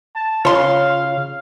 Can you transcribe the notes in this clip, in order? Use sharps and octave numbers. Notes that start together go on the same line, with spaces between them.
A5
C#3 F4 C#5 F5 C6